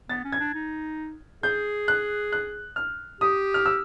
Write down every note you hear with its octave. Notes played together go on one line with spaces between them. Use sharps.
B3 A6
C#4
G#6
D4
D#4
G#4 G6
F#6
F#6
F6
G4 D#6
F6
E6